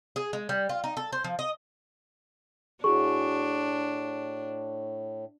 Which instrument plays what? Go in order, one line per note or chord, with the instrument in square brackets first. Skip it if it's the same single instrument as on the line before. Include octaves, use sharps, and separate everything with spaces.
[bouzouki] G#4
G#3
G3
F4
D#4
A4
C5
F3
D#5
[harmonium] A2 [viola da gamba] D4 [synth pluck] E4 F#4 G#4 [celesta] C#6